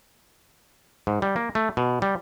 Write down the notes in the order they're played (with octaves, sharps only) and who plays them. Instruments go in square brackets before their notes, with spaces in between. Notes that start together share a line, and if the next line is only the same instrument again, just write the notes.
[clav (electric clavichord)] G#2
G3
A#3
A3
B2
G3